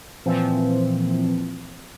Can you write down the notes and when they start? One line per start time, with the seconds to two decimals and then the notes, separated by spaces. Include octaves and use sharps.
0.26 A#2 E3 F3 C4